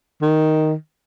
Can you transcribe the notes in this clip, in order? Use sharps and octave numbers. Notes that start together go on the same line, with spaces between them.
D#3